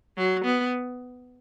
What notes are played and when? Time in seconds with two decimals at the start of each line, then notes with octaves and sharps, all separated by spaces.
0.17 F#3
0.45 B3